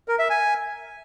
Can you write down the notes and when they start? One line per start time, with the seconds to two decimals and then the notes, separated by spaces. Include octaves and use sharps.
0.08 A#4
0.19 E5
0.30 G#5